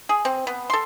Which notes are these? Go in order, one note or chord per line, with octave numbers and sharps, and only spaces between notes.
G#4
C4
B3
A4 C6